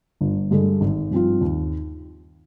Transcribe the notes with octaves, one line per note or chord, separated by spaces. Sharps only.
G1
G2 D3 G#3
G#1
G2 F3 C4 F4
D#2